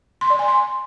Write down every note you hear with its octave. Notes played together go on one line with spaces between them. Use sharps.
C6
D5
G#5
C6